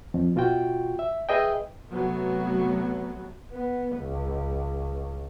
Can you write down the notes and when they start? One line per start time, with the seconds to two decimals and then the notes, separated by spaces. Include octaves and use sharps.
0.14 F2
0.36 B2 F4 F#4 G5
0.99 E5
1.29 G#4 B4 D#5 E5 G5
1.93 C3 F#3 A3 B3
3.52 B3
3.96 C#2